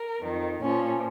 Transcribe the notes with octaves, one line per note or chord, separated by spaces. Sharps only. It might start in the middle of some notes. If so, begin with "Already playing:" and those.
Already playing: A#4
F2 D#3
A#2 F3 C#4